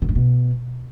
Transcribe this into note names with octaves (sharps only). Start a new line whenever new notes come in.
D3
G2
B2